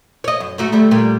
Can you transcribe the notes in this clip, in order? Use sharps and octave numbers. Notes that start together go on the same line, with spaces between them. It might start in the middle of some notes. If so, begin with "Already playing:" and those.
C#5 D#5
F#2
G#2 A3 F#4
D2 G3 A3
A#2 G3